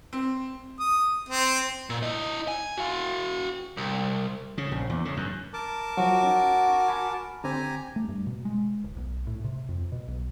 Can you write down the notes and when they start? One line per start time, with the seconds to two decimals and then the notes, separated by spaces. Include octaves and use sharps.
0.13 C4
0.80 D#6
1.29 C4
1.90 A#2
2.03 E4 D#5
2.48 G#5
2.78 F#4 F5
3.77 C2
4.58 C#3
4.72 A#1
4.90 E2
5.05 C#3
5.17 F#2
5.53 A#4 A5 D6
5.97 F3 F#3 F#4
6.23 C#4 D#4
6.88 G#5 B5
7.44 D3 C4 G4 G#5 A#5
7.96 A3
8.08 G2
8.27 B2
8.45 G#3
8.84 D1
8.96 B1
9.27 A2
9.44 C3
9.69 F2
9.92 B2
10.08 B1